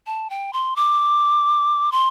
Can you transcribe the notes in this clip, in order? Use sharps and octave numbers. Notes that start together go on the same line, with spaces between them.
A5
G5
C6
D6
C6